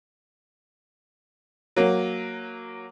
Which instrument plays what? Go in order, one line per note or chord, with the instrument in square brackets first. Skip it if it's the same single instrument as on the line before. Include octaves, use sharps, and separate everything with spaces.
[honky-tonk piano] F#3 A#3